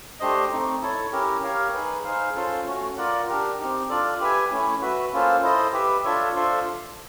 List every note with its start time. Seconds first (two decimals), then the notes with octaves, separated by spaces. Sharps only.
0.20 A3 D4 G4 C5 D#5
0.51 A3 C4 D#4
0.82 E4 A4 C#5
1.12 C#4 E4 G4 A#4
1.43 G4 A#4 C#5 F5
1.74 D#4 G#4 B4
2.04 D#4 G#4 C5 F5
2.36 C#4 F4 A4 C5
2.66 A3 C#4 F#4
2.97 F4 A#4 D5 F#5
3.28 D4 G4 A#4
3.59 C4 D#4 G4
3.89 D4 F4 A4 D5
4.20 G4 B4 E5 G#5
4.51 A3 C#4 E4
4.81 F#4 B4 E5
5.13 A#3 C#4 F4 A4 C5
5.43 E4 A4 C5 D#5
5.73 G4 B4 E5
6.04 D4 F4 A4 C#5 E5
6.35 D4 F4 A4 C5 E5